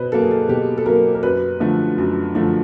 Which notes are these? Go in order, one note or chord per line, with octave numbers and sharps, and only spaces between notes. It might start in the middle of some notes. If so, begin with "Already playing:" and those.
Already playing: B2 B4 C5
F#3 A#3 A4
G#4
A4
B2 G4
A4
F#3 A#3 A#4
A#4
F#2 B4
D3 F3 A3
F#2
D3 F3 A3